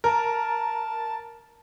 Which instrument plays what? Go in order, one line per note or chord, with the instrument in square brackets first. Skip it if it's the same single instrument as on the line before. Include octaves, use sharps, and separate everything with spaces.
[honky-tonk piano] A#4 [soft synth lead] A5